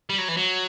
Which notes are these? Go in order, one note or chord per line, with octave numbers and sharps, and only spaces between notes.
G3
F#3
E3
F#3